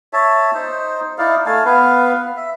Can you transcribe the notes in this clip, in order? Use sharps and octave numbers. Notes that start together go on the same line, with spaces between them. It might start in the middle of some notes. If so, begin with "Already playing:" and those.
C#5 E5 A5
D#4 C5
D#4 E4 D5 F5
A3 F5 G#5 A5
B3 B4 F5
E5